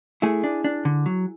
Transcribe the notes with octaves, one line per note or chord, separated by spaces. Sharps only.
A3 E4 G#4
D4
D4
D3
F#3